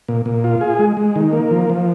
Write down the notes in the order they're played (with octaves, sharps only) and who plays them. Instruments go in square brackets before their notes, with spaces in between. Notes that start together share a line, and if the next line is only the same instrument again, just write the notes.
[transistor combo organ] A#2
A#2
F4
G#4
G#3
G#3
D#3
A#3
F3
F3